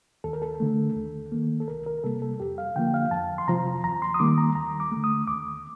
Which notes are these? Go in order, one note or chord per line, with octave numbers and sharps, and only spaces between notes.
D#2 A4
A#4
A4
D3 A3
D#2
D#3 A#3
A4
C2 A#4
A#4
C3 G3 A#3 A4
A4
F2 G4
F5
D3 F3 A#3 G5
F5
F2 A5
C6
C3 F3 A#5
D#2 A#5
C6
D#6
D#3 G3 A#3 D6
A#5
D#2 A#5
D6
D3 A3
D#6
D#2 D6